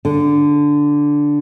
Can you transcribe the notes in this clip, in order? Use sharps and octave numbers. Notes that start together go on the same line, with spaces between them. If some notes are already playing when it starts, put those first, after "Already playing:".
D3